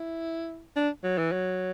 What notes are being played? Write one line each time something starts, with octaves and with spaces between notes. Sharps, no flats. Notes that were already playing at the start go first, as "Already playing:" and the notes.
Already playing: E4
D4
F#3
E3
F#3